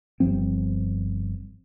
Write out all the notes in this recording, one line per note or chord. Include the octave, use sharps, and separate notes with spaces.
G1 G2 F3 C4